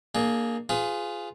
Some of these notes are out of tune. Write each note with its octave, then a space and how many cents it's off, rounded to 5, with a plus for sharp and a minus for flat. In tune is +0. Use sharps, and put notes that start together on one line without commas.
A#3 +0 D4 +30 G#4 +20
F4 +0 G#4 +0 B4 +35